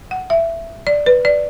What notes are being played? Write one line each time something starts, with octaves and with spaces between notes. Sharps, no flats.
F#5
E5
D5
B4
D5